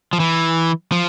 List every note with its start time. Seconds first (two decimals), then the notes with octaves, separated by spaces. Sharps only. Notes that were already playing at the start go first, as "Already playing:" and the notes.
0.13 F3
0.20 E3
0.92 F3